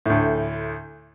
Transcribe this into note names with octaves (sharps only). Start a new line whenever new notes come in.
D2 A2